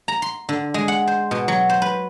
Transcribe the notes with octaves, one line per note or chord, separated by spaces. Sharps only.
A#5
C6
D3
G#3
F#5
C5
B2
F#3
C5
B4